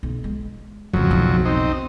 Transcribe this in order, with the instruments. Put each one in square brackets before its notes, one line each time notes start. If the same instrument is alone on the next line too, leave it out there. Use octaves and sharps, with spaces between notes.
[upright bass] B1
G#3
[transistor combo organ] F2 F#3 [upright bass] G#2 C#3
[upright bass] B1 E2
[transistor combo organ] C4 D#4